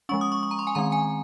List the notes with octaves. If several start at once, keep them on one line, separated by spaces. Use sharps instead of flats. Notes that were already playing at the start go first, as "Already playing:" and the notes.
F3 G#3 C#4 C#6
D#6
C#6
C#6
A#5
C6
G#5
D#3 G#3 C4 A#5
G#5